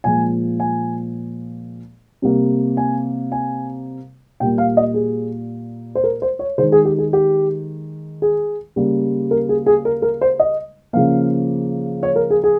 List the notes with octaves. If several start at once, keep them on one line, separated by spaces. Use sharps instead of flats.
A#2 F3 G#3 G#5
G#5
C3 G3 A#3
G#5
G#5
A#2 G3 A#3 G5
F5
D#5
G#4
C5
A#4
C5
C#5
D#3 G#3 C5
G#4
G4
G#4
G4
G#4
C#3 G3 A#3
A#4
G#4
G#4
A#4
A#4
C5
D#5
C#3 F3 A#3 F5
C#5
A#4
G#4
G#4